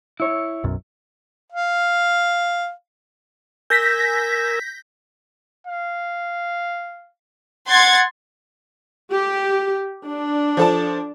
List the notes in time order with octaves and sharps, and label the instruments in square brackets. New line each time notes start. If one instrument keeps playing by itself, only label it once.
[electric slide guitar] E4 C#5
[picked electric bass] B1 F#2
[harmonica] F5
[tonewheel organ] A#4 G#5 E6 [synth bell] G6 A#6 B6
[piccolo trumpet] F5
[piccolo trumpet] F#5 [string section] C6 G#6 A6
[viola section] G4
D4
[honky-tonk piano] F3 A4 A5